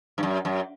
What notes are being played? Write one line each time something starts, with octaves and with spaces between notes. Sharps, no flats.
G2
F#2
F#2